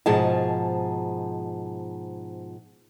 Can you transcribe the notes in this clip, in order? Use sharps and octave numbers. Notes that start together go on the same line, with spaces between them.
G#2 B2 F3 G#4 A5